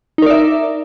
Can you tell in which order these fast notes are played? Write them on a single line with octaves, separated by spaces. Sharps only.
D#4 A#4 D5 E5